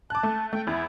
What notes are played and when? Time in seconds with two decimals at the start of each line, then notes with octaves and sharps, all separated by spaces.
0.10 A5 D6 F#6
0.23 A3
0.53 A3 G5
0.67 E2 E4